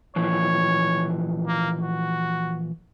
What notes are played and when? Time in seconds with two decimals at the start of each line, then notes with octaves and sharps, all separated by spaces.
0.16 A#2 E3 F3 C#5
1.47 A#3
1.82 F#4